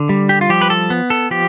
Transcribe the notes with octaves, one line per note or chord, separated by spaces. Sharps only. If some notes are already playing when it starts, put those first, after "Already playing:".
Already playing: D3
G3
G4
F4
F3 G4
B4
A4
B3
A4
F3 G4